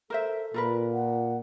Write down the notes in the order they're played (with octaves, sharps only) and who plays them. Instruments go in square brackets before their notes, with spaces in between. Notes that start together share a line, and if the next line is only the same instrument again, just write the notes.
[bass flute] A4 [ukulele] A#4 C5 E5
[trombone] A#2 [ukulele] F4 A#4 B4
[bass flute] F#5